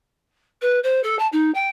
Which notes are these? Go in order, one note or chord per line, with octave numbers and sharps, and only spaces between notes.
B4
C5
A4
A5
D#4
G5